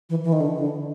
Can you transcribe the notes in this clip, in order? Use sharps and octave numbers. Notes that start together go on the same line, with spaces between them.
E3
E3
D#3
D3
D3